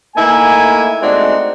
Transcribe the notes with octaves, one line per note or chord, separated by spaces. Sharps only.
A3 A#3 D#4 E4 G#5
G#3 A3 C4 D4 D#4 F#4